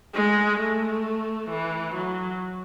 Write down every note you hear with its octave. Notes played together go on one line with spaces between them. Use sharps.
G#3
A3
E3
F#3